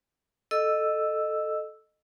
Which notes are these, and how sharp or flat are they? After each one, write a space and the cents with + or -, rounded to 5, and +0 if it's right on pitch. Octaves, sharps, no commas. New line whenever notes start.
A4 +0 D#5 -15 E6 +0